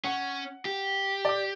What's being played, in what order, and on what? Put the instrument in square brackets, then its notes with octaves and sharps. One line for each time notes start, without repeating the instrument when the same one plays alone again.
[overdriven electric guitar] C#4 [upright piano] F#5
[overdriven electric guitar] G4
[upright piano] D5 D6